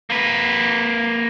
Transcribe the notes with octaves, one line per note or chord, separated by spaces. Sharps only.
A#3 B4